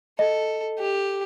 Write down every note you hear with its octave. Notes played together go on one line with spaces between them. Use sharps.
A4 D#5
G4